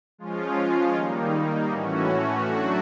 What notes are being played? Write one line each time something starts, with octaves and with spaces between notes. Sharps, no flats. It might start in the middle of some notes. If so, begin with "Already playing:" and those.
F3 G#3 C#4 F4
D#3 G3 A#3 D#4
A2 E3 A3 C#4 F#4
F#3 A3 D4 F#4